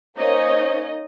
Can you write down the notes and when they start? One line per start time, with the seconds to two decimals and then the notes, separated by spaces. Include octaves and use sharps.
0.18 A#3 C#4 D#4 C5 C#5 D#5